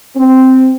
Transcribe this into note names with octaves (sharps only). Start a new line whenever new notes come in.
C4